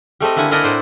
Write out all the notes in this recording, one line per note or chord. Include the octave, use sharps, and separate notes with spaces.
G3 A3 C4 D#5
D3 A#3 E4 F#5 G#5
D4 E4 A#4 D5 D#5 F#5
A2 C5 D5